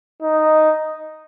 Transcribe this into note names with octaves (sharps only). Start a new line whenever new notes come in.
D#4